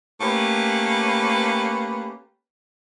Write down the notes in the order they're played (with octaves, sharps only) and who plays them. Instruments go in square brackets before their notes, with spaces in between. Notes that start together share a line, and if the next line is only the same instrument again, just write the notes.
[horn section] A3 A#3 C#4 G4 B4